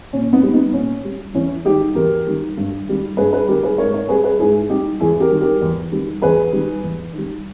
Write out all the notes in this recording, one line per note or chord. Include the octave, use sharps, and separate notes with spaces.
A#2 C#4
B3 D#4
G3
B3 D#4
A#2 C#4
G3
E2 C#4 E4
D#3 G3 D#4 G4
E2 G4 A#4
D#3 G3
G2
D#3 G3
G2 G#4 B4
G#4 B4
D#3 G3 G4 A#4
G#4 B4
G#2 A#4 C#5
A#4 C#5
G3 G#4 B4
G#4 B4
G#2 E4 G#4
G3 D#4 G4
E2 E4 G#4
G4 A#4
D#3 G3
G4 A#4
E2
D#3 G3
E2 G#4 B4
D#3 G3
E2
D#3 G3